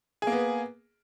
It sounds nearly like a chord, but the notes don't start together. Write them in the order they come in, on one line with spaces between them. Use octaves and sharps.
G#4 A#3 B3